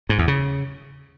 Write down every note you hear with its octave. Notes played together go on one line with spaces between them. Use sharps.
G#2
E2
C#3